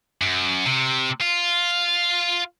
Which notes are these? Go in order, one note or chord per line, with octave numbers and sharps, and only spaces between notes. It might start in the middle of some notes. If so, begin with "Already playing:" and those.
F#2
C3
F4